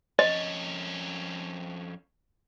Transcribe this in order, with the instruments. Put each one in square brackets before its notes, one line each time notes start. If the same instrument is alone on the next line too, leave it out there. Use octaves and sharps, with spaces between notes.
[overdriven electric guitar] F2 C#4 [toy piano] D#5